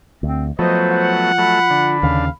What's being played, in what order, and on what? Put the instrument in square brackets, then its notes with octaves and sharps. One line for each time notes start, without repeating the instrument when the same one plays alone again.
[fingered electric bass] D2 [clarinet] C4
[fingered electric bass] F3 [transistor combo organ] F#3 A3 B3 [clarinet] C5 [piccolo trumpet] D#5
[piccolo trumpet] F#5
[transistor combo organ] F#3 A3 [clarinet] B5
[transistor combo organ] D3
[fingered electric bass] D#2 C#3 [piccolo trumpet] F5